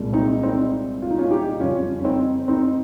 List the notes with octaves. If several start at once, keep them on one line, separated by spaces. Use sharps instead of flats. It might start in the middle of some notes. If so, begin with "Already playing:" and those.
Already playing: C2 A#2 G#3
C4 D#4
C4 D#4
F4
D#4
C#4 F4
D#4 G4
F2 C#3 G3 C#4 F4
C#4
C4 D#4
C4 D#4